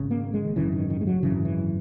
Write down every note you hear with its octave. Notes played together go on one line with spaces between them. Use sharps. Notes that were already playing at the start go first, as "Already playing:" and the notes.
Already playing: G#1 C#3
A#3
G#3
D#3
G#1 F#2 C#3 E3
D#3
D#3
G#3
F#3
G#1 F#2 C#3 E3
E3